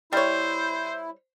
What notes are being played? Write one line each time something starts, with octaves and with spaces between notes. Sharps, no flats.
G3 E4 C5 C#5